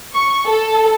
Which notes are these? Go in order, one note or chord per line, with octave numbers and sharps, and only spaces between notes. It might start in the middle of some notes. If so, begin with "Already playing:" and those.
C#6
A4